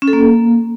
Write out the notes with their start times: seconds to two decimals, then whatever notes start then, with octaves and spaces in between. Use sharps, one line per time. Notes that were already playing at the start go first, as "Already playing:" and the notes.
0.02 C#4
0.08 A4
0.13 A#3